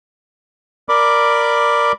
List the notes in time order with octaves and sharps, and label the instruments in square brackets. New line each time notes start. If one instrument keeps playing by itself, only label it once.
[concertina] A#4 D5 B5 D6